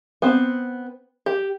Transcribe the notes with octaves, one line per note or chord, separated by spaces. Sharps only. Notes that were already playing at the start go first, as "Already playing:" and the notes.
B3 C4 C5
G4